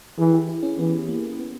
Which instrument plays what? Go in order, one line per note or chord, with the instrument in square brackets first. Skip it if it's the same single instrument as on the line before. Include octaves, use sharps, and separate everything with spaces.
[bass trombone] E3 [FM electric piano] G#4
[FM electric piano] G4
E4
C#4
[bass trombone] E3 [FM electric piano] B3
[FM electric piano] A#3
B3